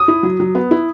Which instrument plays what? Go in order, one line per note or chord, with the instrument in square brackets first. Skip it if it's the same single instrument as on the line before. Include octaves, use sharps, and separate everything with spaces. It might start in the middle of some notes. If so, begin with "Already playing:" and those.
Already playing: [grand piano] D#6
[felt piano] E4
F#3
F#3
B3
E4